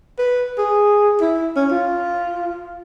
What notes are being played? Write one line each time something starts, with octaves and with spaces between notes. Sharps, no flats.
B4
G#4
E4
C#4
F4